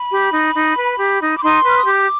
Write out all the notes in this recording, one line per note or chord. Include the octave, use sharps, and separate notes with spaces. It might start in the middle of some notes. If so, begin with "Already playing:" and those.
Already playing: B5
G4
D#4
D#4
B4
G4
D#4
D6
D#4 C6
B4 F6
D#6
G4 D6